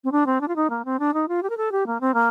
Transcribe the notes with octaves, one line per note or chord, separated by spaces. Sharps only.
C4
D4
C4
D4
F4
D#4
A#3
C4
D4
D#4
F4
G4
A#4
A4
G4
A#3
C4
A#3